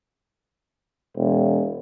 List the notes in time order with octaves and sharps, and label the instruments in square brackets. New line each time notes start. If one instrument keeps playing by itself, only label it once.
[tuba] E1